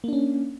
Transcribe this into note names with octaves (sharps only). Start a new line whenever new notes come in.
A#3 C#4 D4